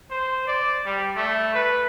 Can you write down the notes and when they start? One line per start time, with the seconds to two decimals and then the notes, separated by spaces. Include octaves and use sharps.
0.11 C5
0.47 D5
0.86 G3
1.16 A3
1.54 B4